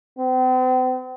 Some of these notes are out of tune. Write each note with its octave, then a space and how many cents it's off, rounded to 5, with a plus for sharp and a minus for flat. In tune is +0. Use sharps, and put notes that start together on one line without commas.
C4 -40